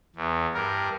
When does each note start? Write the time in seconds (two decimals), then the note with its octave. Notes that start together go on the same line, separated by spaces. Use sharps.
0.16 E2
0.55 G2 A#4